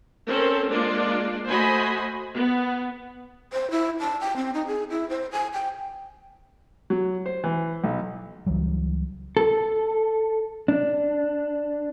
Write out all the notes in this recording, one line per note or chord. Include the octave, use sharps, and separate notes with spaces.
C4 C#4 A4 A#4 C5
G#3 A#3 D4 F4 D5
A3 F#4 C5 D#5 G#5 B5
B3
C5
E4
A5
G5
C4
D#4
G#4
E4
C5
G#5
G5
F#3
C5
E3
B1
C#2 E3 F#3 G3
A4
D4